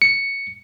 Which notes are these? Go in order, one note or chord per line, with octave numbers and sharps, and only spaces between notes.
C#7